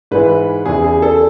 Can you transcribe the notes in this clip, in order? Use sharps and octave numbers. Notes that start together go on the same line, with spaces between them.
G#2 E3 B4
E2 C#3 E3 G#4
G#4
A4